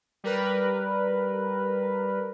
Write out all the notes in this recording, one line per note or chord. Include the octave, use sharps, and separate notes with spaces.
G3 A#4 B4